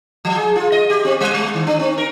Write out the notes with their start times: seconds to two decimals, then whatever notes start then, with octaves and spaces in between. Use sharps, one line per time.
0.25 F3
0.36 G#4
0.56 F4
0.72 D#5
0.90 G4
1.05 C4
1.21 G3
1.34 G#3
1.54 D#3
1.67 D4
1.79 C4
1.98 A#4